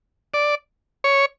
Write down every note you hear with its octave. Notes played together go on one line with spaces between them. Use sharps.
D5
C#5